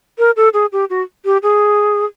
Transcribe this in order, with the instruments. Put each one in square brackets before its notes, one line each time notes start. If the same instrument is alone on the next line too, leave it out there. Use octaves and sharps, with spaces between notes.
[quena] A#4
A4
G#4
G4
F#4
G4
G#4